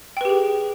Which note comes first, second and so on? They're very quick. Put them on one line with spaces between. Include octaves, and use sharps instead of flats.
G5 B4 G4 G#4